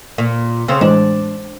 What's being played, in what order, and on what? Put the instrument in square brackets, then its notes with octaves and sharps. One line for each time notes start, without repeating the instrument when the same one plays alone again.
[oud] A#2
[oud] C#3 C4 [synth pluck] E6 G#6
[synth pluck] A2 E3 G#3 [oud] D4